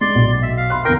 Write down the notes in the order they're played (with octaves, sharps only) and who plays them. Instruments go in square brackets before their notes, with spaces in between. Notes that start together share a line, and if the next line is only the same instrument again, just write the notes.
[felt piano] G#3 [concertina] D5 C6
[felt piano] B1
[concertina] E5
F5
[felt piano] B5 C6 F#6
[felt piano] E2 D3 A#6 [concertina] A#4 G5